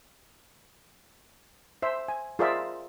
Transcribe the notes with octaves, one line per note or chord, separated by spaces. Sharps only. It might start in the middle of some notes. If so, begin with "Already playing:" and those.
C5 E5
G#5
F4 G#4 A#4 C5 D5 E5